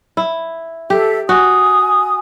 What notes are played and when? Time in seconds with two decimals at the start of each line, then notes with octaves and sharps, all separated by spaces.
0.17 E4
0.90 G4 A4 E5
1.29 F#4 G#5 D#6